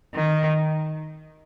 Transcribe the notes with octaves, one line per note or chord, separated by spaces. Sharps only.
D#3